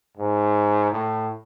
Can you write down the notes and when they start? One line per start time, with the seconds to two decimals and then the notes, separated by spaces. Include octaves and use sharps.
0.17 G#2
0.91 A2